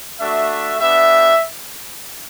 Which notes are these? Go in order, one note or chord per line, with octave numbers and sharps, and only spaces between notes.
A3 D4 F#4 E5
B3 D4 G4 E5